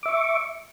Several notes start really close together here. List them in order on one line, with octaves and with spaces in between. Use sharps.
D6 E5 C#6